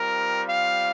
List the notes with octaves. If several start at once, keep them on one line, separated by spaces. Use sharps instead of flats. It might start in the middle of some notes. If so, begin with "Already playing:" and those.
Already playing: G3 C4 F4 A#4
F5